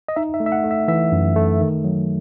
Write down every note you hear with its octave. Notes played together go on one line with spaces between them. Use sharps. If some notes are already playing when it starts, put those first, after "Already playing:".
D#5
D#4 E5
E5
A3
E5
F#5
A3
E5
E3 E5
F#2
A3
D#3
F#3